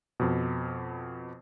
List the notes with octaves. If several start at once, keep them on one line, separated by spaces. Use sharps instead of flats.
F2 B2